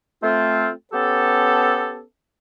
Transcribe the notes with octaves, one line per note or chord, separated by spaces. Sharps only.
A3 C4 F4
B3 C#4 G4 A4